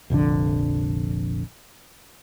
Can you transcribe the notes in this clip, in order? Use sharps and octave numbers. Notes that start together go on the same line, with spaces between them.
F1 A#1 F2 D3